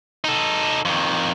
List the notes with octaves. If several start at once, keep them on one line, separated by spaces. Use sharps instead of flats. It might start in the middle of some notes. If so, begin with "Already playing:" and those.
D#4 A4
F2 D#3